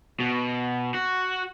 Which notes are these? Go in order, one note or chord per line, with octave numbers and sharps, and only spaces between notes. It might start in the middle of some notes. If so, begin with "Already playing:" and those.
B2
F#4